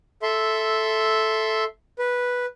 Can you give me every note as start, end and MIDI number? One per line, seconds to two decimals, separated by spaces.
0.23 1.64 69
0.23 1.64 76
0.23 1.64 84
1.99 2.46 71